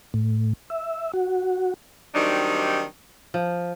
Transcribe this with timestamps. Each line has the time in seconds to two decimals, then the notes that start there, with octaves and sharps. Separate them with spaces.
0.14 A2
0.70 E5
1.13 F#4
2.14 D#3 F#3 G3 C4 D4 D#4
3.34 F3